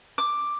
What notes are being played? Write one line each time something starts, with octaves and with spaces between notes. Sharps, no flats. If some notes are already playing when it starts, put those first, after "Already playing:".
D6